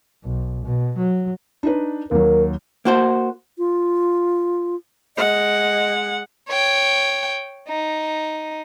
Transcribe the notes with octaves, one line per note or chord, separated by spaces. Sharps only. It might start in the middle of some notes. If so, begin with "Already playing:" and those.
B1
B2
F#3
D4 D#4 B4
D#2 F#3 A#4
A#3 F#4 C5
F4
G#3 D#5 F#5
C#5 G5
D#4